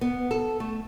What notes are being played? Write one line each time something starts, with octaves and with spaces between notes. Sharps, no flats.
B3
A4
A3